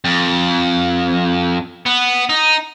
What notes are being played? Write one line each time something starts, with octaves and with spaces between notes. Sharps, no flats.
F2
B3
D#4